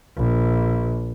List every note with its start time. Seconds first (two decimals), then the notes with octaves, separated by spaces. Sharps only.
0.17 A#1